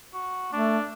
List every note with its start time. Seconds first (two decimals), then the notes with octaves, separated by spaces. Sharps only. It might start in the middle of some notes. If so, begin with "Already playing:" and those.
0.14 F#4
0.53 A3 D4